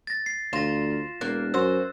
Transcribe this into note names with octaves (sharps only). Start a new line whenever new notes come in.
A6 A#6
C7
D2 F4 A#6 E7
E1 A#3 F#6
F#2 F#4 C5 E6